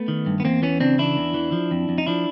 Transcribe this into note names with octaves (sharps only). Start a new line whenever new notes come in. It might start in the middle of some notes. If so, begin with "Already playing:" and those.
Already playing: A3 B3
D#3
G2
B3
E2 A#3 C4
E3 B3 C#4
C#3 C4 D4
E3 D4 E4
E2
E3
F3
F2
F2
D#4
F3 D4 E4